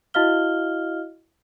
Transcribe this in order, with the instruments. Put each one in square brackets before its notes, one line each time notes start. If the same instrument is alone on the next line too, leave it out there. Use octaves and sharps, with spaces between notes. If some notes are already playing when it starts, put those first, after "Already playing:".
[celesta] E4 F#4 D#5 F5 F6 G7